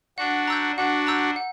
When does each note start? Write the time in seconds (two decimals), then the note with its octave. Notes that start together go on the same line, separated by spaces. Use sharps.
0.18 D4 F#4 F#5
0.47 A#5 E6 G6
0.77 D4 F#4 F#5
1.07 A#5 E6 G6
1.36 F#5